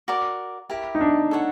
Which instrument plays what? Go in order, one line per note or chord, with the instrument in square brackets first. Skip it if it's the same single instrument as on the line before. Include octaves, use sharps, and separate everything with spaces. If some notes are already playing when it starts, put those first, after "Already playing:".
[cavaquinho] F#4 A#4 D5
E4 G4 A#4
[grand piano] D#4
D4
[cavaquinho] A4 C#5 F#5